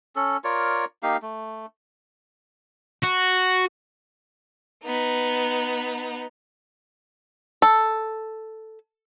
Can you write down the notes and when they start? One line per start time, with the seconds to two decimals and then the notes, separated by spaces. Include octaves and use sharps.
0.16 C#4 A4
0.44 F4 A#4 C#5 D5
1.03 A#3 D#4 G4 F5
1.22 A3
3.03 F#4
4.84 B3 D#4
7.62 A4